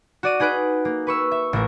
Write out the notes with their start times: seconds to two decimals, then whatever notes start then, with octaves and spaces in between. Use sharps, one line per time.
0.23 F#4 D5 D#7
0.40 D#4 G#4 B4 F#6 D7
0.85 A#3
1.07 B4 C#6 E6
1.31 E5
1.53 A1 A#4